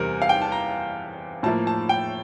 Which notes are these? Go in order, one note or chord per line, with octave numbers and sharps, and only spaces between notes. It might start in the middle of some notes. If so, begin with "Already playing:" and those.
Already playing: E2 C3 G3 A#4
F5
G5
A5
A#5
A2 F3 A#3 A5
A5
G5